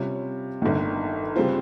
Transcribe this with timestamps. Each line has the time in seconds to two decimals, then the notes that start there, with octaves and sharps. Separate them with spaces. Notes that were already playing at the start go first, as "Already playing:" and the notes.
Already playing: C3 G3 C#4 F4
0.62 G1 G2 D#3
1.36 C#3 G3 C4 F4